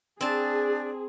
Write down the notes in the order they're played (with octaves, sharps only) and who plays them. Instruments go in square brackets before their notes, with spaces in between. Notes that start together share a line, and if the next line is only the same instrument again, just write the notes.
[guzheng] C4 A5 [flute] D4 [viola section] G#4